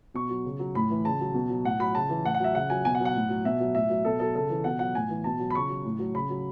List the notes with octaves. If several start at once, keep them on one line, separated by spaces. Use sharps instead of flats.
B2 C#6
F#3
C#3
F#3
A2 B5
E3
C#3 A5
F#3
B2
F#3
A2 F#5
F#3 B5
C#3 A5
E3
A2 F#5
F#5
F#3 E5
C#3 F#5
F#3 G#5
B2 G#5
F#5
F#3
F#5
A2
F#3
B2 E5
F#3
A2 E5
F#3
B2 A4
F#3 A4
C#3 A4
E3
B2 F#5
F#3 F#5
A2 G#5
E3
B2 A5
F#3
B5
C#3 C#6
F#3
A2
F#3
C#3 B5
F#3